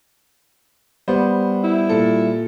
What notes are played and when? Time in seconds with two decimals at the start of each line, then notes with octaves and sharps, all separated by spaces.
1.08 G3 B3 C5
1.64 E4
1.89 A#2 A4